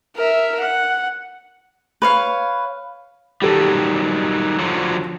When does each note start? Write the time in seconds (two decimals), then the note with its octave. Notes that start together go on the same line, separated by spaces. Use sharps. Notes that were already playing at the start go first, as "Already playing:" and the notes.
0.16 A#4 E5
0.61 F#5
2.02 B4 C#5 F5
3.42 D#3 F#3 G3 G4 A4
4.59 D3 F3 F#3